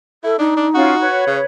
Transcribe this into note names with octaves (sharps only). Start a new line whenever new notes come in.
E4 A4
D4 D#4
D4
C#4 F4 F#4
B4 C#5
C#3